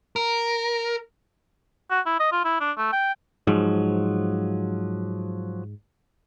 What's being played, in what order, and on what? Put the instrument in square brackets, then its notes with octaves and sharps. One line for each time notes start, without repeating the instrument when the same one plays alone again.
[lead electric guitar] A#4
[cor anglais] F#4
E4
D#5
F4
E4
D4
A3
G5
[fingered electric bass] G#2 [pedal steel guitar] F3 F#3